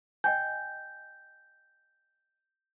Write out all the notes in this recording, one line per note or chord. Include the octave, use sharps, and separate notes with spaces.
D#5 G5 G#5 G6